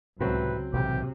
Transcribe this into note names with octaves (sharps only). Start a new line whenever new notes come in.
C#2 A2 C3 F#3 C4 F#4 B4
B1 A2 C3 E3 G4